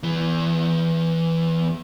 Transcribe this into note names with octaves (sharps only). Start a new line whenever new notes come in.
E2 E3